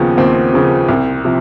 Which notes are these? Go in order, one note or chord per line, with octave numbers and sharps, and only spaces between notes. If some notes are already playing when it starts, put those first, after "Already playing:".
Already playing: D#2 C#3 F3 B3
D#2 C4
C#3 F3
C2
C3 F3